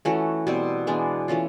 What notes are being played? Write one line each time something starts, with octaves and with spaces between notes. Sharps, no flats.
E3 A3 C#4 F#4
B2 G3 C4
E3 G#3 B3 D4
E3 A3 C#4 F4